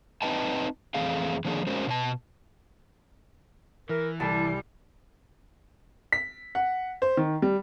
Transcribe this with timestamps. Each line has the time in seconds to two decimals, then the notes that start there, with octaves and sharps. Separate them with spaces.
0.22 C4 D#4 B4 D#5 G5 A5
0.94 F2 E3 A3 C4 G#4 F5
1.45 D3 D#3 F3 A#3 D4 G#4
1.67 G#3 C#4 F#4 A#4 C5
1.87 B2 C5 A5
3.89 E3 A#4
4.20 C2 G3 A5
6.12 B6
6.55 F#5
7.02 C5
7.17 D#3
7.42 G3